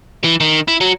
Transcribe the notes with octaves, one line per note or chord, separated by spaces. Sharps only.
E3
D#3
E4
F#3